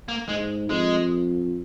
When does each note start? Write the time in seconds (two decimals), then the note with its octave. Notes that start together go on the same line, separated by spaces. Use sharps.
0.08 A#3
0.28 G#2 G#3
0.70 F2 G#3